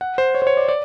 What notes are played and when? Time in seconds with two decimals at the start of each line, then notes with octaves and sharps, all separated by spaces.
0.01 F#5
0.18 C5
0.35 C#5
0.42 C5
0.47 C#5
0.57 D5
0.68 D5